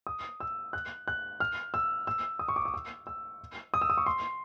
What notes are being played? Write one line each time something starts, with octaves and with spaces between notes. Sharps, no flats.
D#6
E6
F#6
F#6
F6
E6
E6
D#6
C#6
D6
D#6
E6
E6
D#6
E6
D#6
C#6
C6